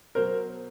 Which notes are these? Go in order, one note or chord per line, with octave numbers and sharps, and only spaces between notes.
B2 F#3 A#4 C5